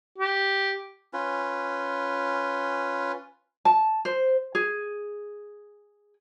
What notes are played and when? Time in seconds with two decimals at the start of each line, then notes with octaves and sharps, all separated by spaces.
0.18 G4
1.13 C#4 F4 B4
3.65 A5
4.05 C5
4.55 G#4